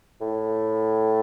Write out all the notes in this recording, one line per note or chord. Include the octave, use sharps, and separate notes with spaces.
A2